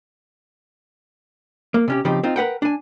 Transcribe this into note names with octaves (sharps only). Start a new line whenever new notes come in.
A#3
C3 C#4 G4
C#3 F3 C4 D#4 G4
C4 D#4 F4
A#4 B4 F#5 G5
D4 G#5